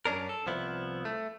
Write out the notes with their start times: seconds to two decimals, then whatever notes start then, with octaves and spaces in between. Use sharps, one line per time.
0.05 F#2 C#4 D4 A#4
0.29 A4
0.47 C2 F3 B3 E4
1.05 A3